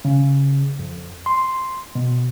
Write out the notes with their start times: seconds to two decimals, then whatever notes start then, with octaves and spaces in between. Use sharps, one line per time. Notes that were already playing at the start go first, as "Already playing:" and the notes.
0.05 C#3
0.79 F2
1.26 C6
1.95 B2